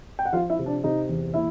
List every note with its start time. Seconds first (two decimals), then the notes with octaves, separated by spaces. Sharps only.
0.19 G5
0.25 F#5
0.32 F3 F4 F5
0.50 E4 E5
0.59 C3
0.66 D4 D5
0.84 C3 D#4 D#5
1.09 E2
1.34 A#2 E4 E5